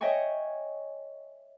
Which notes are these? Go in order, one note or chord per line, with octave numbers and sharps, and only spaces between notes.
C#5 D#5 E5 G5 G#5 C#6